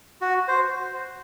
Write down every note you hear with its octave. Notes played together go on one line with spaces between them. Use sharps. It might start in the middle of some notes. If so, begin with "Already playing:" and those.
F#4
C5